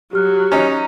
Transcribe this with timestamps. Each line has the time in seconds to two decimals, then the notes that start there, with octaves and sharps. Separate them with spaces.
0.13 F#3 G4 F6 F#6
0.52 C#4 D#4 A#5